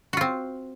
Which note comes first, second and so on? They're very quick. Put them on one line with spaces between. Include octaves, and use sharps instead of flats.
F#4 F4 C4